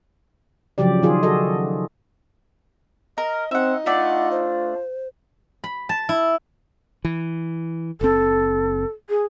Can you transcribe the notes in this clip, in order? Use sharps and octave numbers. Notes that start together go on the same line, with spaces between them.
C#3 F3 F#3 G4 D5
D#3 F4 G#4
F#4 A4 D#5
A#4 D#5
C4 D#4 E5 F#5
A3 D4 F4 D5 F#5
C5
B5
A5
E4
E3
F#1 C4 A4
G#4